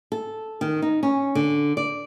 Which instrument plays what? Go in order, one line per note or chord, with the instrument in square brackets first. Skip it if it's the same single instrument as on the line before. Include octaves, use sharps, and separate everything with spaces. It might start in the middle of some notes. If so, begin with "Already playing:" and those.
[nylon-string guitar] A4
D#3
D#4
C#4
D3
D5